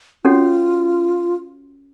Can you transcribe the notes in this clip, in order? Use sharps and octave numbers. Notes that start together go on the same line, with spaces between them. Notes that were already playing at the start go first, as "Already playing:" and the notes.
C#4 F4 F#4 A4 C#5 F#5